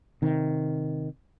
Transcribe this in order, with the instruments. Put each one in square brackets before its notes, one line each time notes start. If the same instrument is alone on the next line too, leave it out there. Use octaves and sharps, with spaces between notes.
[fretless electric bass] C3 D#3